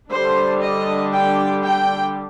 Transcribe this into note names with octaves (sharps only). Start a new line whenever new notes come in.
D3 G3 D4 C5
D#5
G5
G5